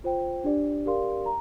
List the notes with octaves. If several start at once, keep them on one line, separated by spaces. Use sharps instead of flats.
F4 C5 G5
D4 G4 D5
G4 A#4 D5 F5 C6
A#5